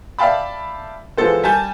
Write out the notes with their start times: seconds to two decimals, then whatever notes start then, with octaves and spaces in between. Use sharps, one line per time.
0.19 D5 E5 F5 G5 A5 B5
1.17 E3 F3 G#3 B3 A4 C5
1.44 G3 G#5 A5 G6